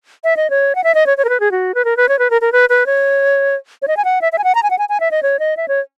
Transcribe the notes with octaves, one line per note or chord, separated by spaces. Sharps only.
E5
D#5
C#5
F#5
E5
D#5
C#5
C#5
A#4
B4
G#4
F#4
B4
A#4
B4
C#5
B4
A#4
A#4
B4
B4
C#5
C#5
D#5
G#5
F#5
E5
E5
G#5
F#5
A#5
G#5
F#5
G#5
G#5
E5
D#5
C#5
D#5
E5
C#5